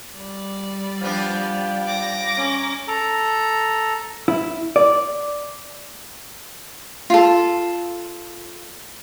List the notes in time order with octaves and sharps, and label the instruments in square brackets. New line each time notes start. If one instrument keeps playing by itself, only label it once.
[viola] G3 D5
[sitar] F3 B3 D4 [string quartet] G5
[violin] D6 A#6
[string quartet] C#4 A#5
[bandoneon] A4 A#5
[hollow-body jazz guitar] E4
D5
[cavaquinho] F4 A4